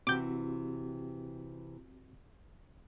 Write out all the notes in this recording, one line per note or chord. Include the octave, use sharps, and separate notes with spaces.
C3 E3 C4 F#4 G4 D6 G6